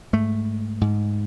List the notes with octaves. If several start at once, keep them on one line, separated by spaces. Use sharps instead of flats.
G#2 A3
G#2